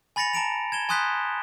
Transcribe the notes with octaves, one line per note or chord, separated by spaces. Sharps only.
G#5 B5 A6 A#6 C#7 F7
A5 A#5 D7 F7
G#6 E7 G7
G#5 C6 D#6 F#6 G6 B6